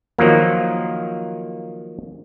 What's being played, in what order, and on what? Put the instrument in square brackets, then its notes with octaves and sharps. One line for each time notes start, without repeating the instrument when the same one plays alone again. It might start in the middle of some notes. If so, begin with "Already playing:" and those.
[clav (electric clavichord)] D#3 F3 F#3 A#3